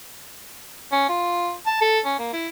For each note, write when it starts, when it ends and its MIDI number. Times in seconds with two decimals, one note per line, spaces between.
0.92 1.06 61
1.09 1.54 65
1.67 1.77 81
1.81 2.00 69
2.05 2.14 61
2.19 2.29 58
2.33 2.48 64